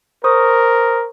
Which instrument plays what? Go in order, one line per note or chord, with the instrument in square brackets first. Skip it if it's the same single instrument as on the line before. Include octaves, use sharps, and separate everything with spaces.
[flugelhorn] A#4 [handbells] C5 C#6 D#6